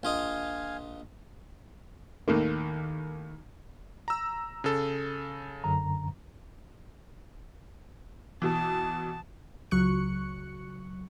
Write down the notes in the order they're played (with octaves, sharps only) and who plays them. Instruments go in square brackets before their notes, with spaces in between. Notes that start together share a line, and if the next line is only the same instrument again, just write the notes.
[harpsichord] A#1 F4 D#5 [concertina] F5 G#5
[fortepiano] D#2 A2 A#3 [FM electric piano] D#3
[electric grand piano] A#5 E6
C#3 A4
[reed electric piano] F#2 D3 A#5
[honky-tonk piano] B2 E3 [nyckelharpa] A5
[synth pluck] C#2 F#3 C#6 F#6 C#7